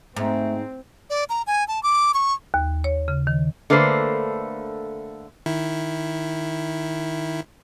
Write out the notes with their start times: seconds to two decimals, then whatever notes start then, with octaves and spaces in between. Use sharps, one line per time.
0.17 G#2 A3 C4
1.10 D5
1.29 A#5
1.47 G#5
1.68 A5
1.83 D6
2.14 C#6
2.54 D#2
2.84 C#5
3.08 C#3
3.27 D#3
3.70 D3 A3 A#3 B4 C5
5.46 D#3 E4